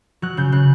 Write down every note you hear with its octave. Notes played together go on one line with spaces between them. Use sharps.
F#3 F#6
C#3 G6
C#3 F#6